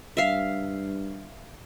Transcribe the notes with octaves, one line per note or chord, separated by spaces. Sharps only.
G2 E5 F5